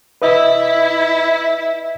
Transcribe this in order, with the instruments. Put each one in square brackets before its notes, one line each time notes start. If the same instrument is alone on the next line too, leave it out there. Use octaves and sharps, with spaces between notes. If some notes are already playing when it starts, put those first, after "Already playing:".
[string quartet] E4 [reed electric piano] B4 D#5 E5